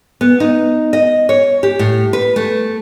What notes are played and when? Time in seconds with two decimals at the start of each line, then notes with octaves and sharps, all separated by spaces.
0.21 B3
0.40 D#4
0.93 D#5
1.29 C#5
1.63 G4
1.79 A2
2.13 B4
2.36 A3